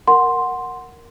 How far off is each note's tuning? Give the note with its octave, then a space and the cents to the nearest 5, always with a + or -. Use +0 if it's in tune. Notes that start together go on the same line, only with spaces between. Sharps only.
A#4 +0 F#5 -5 C6 +0